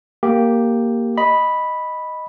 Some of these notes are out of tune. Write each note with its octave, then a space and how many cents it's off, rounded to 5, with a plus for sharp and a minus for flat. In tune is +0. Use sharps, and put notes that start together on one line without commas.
A#3 +0 G4 +0
D#5 +0 B5 -5